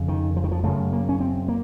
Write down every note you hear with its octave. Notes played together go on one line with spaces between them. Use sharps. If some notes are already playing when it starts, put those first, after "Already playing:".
Already playing: F2 C#3
D#3
F3
D#3
F3
F#2 C#3 A3
A#3
C#4
C4
A#3